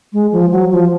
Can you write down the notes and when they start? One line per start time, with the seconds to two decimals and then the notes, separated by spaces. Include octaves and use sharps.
0.13 G#3
0.32 F3
0.52 F#3
0.71 F3